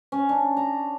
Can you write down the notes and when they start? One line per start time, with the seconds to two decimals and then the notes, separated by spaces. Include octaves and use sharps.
0.12 C#4
0.29 D4
0.57 A#5